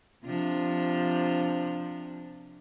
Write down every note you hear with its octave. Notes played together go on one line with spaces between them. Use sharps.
C3 F3 D4